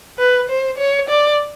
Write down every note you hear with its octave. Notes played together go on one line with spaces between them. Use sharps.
B4
C5
C#5
D5